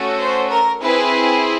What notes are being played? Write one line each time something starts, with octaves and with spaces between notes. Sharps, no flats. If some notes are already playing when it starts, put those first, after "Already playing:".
Already playing: A3 C#4 F#4 A4
C5
A#4
C4 E4 G#4 B4